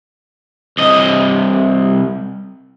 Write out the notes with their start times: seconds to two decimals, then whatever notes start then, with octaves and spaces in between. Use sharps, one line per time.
0.77 C2 D#5